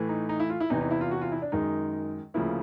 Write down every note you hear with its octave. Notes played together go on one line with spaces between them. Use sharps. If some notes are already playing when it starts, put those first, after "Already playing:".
Already playing: A2 E3 A3
D#4
D#4
E4
F4
E4
E2 C3 E3 D#4
D#4
E4
F4
F#4
F4
E4
D4
F#2 D#3 G#3 D#4
D2 C#3 F3 A#3 E4